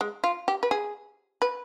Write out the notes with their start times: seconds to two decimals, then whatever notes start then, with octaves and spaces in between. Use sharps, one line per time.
0.01 G#3
0.24 F4
0.48 G4
0.63 B4
0.71 G#4
1.42 B4